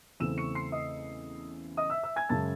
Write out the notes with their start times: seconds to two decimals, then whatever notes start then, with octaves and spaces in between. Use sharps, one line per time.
0.20 E2 C#3 E3 A3 C4 E6 E7
0.38 C#6 C#7
0.55 C6 C7
0.72 D#5 D#6
1.77 D#5 D#6
1.90 E5 E6
2.04 E5 E6
2.16 G#5 G#6
2.29 F#2 C#3 G#3 A5 A6